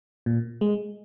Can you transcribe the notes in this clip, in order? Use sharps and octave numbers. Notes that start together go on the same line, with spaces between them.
A#2
G#3